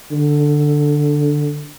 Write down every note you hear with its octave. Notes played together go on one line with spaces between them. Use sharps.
D3